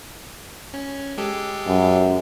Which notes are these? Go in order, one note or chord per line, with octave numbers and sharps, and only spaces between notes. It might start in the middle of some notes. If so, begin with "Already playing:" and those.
C#4
G#3 G4 A4
F#2